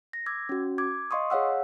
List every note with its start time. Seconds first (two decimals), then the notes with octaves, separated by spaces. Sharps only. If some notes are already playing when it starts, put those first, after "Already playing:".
0.13 A#6
0.26 D6 E6 G#6
0.49 C#4 F#4
0.78 D6 G#6
1.11 D#5 F5 C6 C#6 D#6
1.30 G#4 C#5 F5 F#5 E6